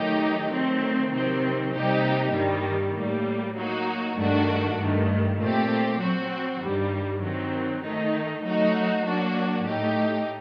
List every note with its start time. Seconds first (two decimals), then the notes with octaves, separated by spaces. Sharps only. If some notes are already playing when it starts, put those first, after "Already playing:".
Already playing: D#3 F#3 A3 D#4 G4
0.51 D#3 F#3 A3 C4
1.12 C3 D#3 F#3 C4
1.73 C3 G3 A#3 D#4 G4
2.33 G2 D#3 G3 A#3
2.95 A2 G3 A#3
3.56 F#3 A#3 D#4 F#4
4.17 G2 D#3 A3 D4 F#4
4.77 G2 D#3 A3
5.38 A#2 A3 C4 G4
6.00 F#3 C4 F#4
6.60 G2 D#3 G3
7.21 D#3 F#3 C4
7.82 D#3 A3 D#4
8.43 F#3 A3 D#4 F#4
9.04 F#3 A#3 D4 F#4
9.65 A2 A3 D#4 G4